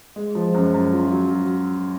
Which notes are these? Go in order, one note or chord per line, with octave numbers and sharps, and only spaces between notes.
G#3
F3
F#2
F#2
F4
F#3
F#3